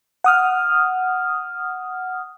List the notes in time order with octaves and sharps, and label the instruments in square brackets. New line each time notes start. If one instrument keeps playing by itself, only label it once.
[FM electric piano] F#5 D#6 F6